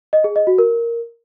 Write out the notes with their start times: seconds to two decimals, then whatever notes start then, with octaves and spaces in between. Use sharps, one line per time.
0.13 D#5
0.24 G#4
0.36 D#5
0.47 F#4
0.58 A#4